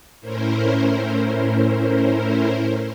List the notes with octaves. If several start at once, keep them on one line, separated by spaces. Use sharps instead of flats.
A2 C#4 E4 A#4 C5